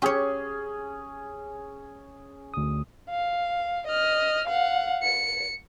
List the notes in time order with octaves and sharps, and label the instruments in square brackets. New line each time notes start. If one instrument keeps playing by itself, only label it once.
[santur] C#4 G#4 [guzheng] G4 C#5
[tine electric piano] D2 D#6
[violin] F5
D#5 F6
F5 F#5
C#7